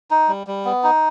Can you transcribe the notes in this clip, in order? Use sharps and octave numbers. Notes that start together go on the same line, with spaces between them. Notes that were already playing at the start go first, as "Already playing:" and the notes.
D#4
G3
G3
B3
D#4